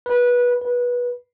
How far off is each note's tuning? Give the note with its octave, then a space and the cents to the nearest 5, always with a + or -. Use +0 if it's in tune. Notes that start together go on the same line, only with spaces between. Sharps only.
B4 -20
B4 -20